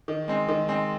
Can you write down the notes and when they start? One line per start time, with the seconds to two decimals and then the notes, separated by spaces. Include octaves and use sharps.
0.08 D#3
0.28 G#3 C4
0.48 D#3
0.68 G#3 C4